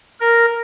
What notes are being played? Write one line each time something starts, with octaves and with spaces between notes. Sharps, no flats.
A#4